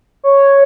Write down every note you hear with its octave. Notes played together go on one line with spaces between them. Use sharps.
C#5